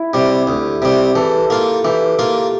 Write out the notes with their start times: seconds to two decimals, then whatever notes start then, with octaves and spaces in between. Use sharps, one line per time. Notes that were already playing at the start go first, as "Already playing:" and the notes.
Already playing: E4
0.13 C3 G3 G4
0.47 D2
0.82 C3 G3
1.15 E3 A4
1.50 A#3 F4
1.84 E3 G4
2.19 A#3 F4